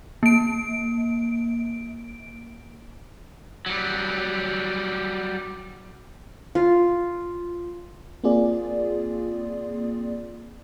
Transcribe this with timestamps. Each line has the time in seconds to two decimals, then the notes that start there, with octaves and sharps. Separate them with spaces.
0.23 A#3 D7
3.66 F#3 G3
6.55 F4
8.24 A#3 C4 F4 G#4 D5